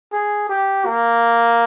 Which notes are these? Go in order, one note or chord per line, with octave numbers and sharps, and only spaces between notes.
G#4
G4
A#3